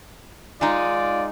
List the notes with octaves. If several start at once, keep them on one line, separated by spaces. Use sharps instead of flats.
G#3 D#4 F4 D5